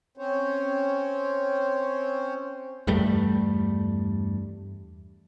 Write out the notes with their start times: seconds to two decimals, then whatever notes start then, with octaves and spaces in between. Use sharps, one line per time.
0.17 C4 C#4 C5 C#5
2.87 E2 G2 G3 A3